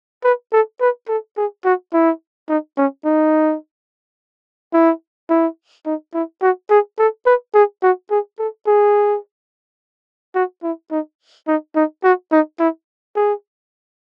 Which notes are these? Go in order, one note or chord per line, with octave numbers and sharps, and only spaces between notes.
B4
A4
B4
A4
G#4
F#4
E4
D#4
C#4
D#4
E4
E4
D#4
E4
F#4
G#4
A4
B4
G#4
F#4
G#4
A4
G#4
F#4
E4
D#4
D#4
D#4
F#4
D#4
E4
G#4